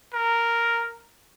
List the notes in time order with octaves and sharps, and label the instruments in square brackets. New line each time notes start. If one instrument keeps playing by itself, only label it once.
[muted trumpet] A#4